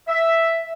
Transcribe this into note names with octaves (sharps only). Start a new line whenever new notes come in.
E5